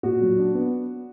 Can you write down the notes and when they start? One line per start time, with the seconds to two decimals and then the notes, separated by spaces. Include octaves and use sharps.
0.03 A#2 F#4
0.21 F#3
0.38 D4
0.55 B3